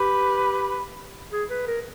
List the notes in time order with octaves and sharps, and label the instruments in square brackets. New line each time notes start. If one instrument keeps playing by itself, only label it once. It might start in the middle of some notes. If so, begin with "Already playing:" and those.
Already playing: [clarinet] G4 [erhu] B4
[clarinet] G#4
B4
A#4